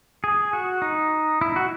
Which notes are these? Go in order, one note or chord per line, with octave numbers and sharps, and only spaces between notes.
G#4
F#4
D#4
E4
F#4